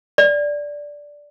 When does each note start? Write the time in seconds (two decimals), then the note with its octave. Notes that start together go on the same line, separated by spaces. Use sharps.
0.18 D5